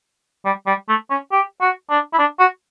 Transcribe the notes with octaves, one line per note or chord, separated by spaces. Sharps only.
G3
G3
A3
C#4
G4
F#4
D4
E4
D4
F#4